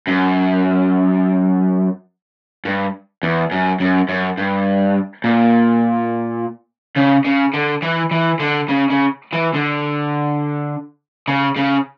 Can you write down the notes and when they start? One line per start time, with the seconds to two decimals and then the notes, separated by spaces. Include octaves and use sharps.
0.07 F#2
2.65 G2
3.23 E2
3.51 F#2
3.80 F#2
4.09 F#2
4.37 G2
5.24 A#2
6.97 C#3
7.25 C#3
7.53 D3
7.82 E3
8.11 E3
8.40 D3
8.69 C#3
8.90 C#3
9.33 E3
9.55 D3
11.28 C#3
11.56 C#3